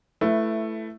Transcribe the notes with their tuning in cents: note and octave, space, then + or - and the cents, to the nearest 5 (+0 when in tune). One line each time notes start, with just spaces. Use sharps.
A3 +0 E4 +15 B4 +0